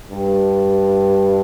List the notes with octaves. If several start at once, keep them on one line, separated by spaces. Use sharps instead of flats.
G2